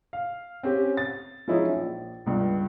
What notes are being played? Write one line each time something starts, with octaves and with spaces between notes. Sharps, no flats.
F5
C4 C#4 G4
A6
F3 F#3 G#3 C#4 D#4 E4
A#1
C#2 G2